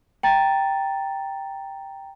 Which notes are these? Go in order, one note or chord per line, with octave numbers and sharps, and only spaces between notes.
G5 A#5 A6